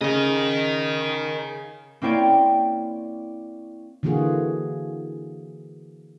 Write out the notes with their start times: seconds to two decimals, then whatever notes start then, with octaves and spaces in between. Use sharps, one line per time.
0.01 C#3 A#4 D#5
2.02 A#3 C4 E4 C#5 D5 G5
4.03 D3 E3 A#3 F4 F#4 G#4